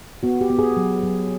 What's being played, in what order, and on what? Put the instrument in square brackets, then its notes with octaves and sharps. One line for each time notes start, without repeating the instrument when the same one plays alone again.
[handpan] B3 F#4
G4
B3
G#4
F#3
F#3